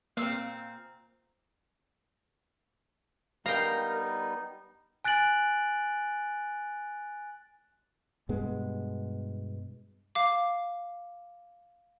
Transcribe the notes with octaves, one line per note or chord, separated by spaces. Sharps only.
A#2 A#3 C4 F5 E6
G3 B3 D#4 A#4 F5 G5 A#5
G#5 F#6 A6 D7 F#7
G2 B2 G#3 B3
F5 D6